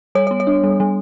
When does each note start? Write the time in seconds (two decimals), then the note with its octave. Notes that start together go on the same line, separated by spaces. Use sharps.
0.15 G3 C#5
0.27 B3 C#5
0.40 C#5
0.47 D4
0.64 G3
0.80 G3